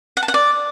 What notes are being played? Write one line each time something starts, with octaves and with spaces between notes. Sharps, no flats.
F#5
A5
F#5
D5